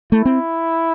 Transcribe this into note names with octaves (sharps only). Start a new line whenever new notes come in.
A3 E4
C4